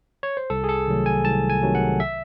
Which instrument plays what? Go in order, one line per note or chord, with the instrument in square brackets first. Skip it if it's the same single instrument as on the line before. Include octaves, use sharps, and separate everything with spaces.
[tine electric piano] C#5
C5
C2 A4
G#4
A4
C3 D#3 F#3 A3
G#5
C2 A5
G#5
C3 D#3 F#3 A3
F#5
E5